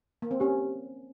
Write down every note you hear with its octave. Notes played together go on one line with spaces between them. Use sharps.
A#3
C4
C#4 G4